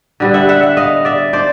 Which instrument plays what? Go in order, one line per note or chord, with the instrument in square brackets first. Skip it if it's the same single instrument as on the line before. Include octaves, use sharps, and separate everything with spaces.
[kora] D3 G3 B3
E5 F#5
E5 F#5
E5 F#5
D#5 F5
D5 E5
C5 D5